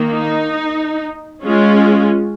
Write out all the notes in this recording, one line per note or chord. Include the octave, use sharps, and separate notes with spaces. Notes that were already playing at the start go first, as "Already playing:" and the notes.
Already playing: D#3 A#3
D#4
G#3 C#4 F4